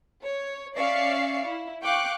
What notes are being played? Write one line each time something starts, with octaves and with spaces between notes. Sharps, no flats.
C#5
C#4 D5 E5 F5 C#6 C7
E4
F5 G5 C#6 D6 F#6